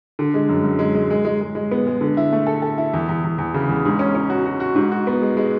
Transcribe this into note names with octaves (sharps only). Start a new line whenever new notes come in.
D3
G#3
F#2
F#2
G#3
G#3
G#3
G#3
G#3
G#3
B3
G#3
D3
E4
A3
A4
A4
E4
E2
E2
E2
E2
C#3
E2
G#2
C#4
C#4
F#4
F#4
F#4
G#2
F#4
B3
G#3
G#3